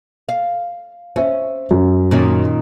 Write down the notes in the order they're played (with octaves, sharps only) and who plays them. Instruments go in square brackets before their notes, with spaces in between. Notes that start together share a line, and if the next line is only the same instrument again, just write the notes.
[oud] F5
[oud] C#4 [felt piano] C5 E5
[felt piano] F#2
[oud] A#2 D#3 C#4